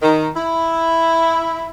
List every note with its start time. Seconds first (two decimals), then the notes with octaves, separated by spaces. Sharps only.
0.02 D#3
0.36 E4